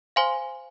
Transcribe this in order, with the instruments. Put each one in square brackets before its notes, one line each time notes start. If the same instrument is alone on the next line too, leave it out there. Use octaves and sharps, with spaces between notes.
[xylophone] C5 F5 G#5 C6